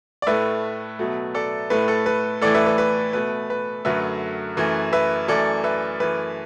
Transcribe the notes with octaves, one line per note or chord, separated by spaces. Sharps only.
D5
A2 A3 B4 E5
B2 F#3 A3
A4 D5
A2 A3 B4
A4
B4
A2 E3 A3 A4 D5
B4 E5
B4
B4
B2 A3 B4
B4
F#2 D3 F#3 A3 B4 E5
F#2 E3 A3
B4 E5
F#2 E3 A3 A4 D5
B4 E5
F#2 E3 A3 B4